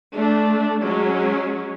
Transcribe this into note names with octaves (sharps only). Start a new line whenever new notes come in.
A3 D4
F#3 G#3 C#4